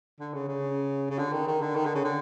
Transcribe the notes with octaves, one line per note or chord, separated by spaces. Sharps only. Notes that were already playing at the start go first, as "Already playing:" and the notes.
D3
C#3
C#3
C#3
D3
D#3
D#3
D3
D#3
D3
C#3
D3